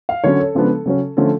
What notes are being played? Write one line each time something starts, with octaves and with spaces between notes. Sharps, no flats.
F5
D3 F#3 C#4 C#5
A4
C#3 F3 G#3 B3 D4
C#3 F#3 C#4
D3 F3 A3 C#4 A4